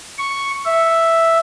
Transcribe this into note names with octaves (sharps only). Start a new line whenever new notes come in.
C#6
E5